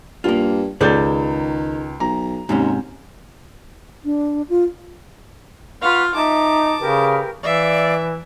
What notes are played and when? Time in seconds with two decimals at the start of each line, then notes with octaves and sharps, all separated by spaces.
0.24 G2 A#3 F4
0.81 C#2 D#3 G#4 A4 D5 G6 A6
2.00 B1 A#5
2.49 D#2 G#2 C3 C#4
4.05 D4
4.49 F4
5.81 F4 B4 F5 F#5 C#6
6.14 D#4 E5 A5 D6
6.80 C#3 G4 A#4 B4
7.43 E3 D5 E5 F5